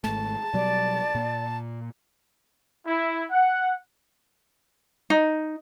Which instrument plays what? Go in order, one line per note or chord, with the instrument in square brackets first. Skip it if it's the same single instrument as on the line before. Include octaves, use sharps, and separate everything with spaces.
[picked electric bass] G#1 G#2 A3 [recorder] A5
[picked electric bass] B2 F#3 G3 [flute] D5
[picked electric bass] A#2
[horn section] E4
F#5
[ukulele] D#4